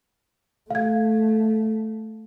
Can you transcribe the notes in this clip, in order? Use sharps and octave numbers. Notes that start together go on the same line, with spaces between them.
A3 F5 G#6